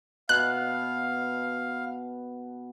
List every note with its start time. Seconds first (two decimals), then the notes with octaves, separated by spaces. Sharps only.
0.29 B2 F5 F#6